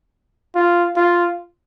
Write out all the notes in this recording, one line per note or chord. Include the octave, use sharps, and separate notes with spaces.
F4
F4